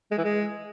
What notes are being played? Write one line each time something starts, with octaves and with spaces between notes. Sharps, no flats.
G#3
E3
G#3